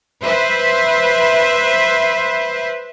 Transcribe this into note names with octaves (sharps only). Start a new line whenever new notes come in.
B4 C5 E5